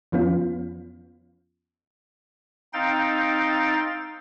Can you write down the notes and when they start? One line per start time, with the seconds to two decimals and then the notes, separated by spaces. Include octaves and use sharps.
0.12 F2 F3 B3 C#4 F4
2.73 C4 D#4 F5 G5 A6